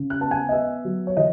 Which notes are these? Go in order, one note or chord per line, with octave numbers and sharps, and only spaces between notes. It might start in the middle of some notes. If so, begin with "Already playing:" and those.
Already playing: C#3
F#6
B3 A5
G#5
D#5
B3 E5
F#3
C#5
E3 D#5